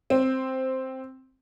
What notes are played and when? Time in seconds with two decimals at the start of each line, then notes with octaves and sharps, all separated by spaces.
0.10 C4